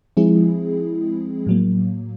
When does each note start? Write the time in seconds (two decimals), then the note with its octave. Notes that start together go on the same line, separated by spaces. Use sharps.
0.17 F3 G#3 C4 E4 G#4
1.47 A2 F#3 A#3